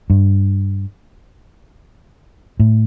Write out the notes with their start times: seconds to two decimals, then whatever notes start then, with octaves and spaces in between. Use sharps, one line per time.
0.10 G2
2.60 A2